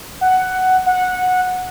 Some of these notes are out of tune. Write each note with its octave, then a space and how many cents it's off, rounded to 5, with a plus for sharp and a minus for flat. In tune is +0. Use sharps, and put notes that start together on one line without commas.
F#5 +10
F#5 -15